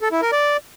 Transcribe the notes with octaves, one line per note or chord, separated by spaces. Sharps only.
A4
E4
A#4
D5